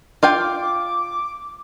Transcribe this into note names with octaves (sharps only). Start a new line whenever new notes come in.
F4 F5 G5 D6